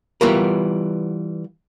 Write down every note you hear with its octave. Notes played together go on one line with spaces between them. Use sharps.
E3 G3 B3 F4 F#4 A#4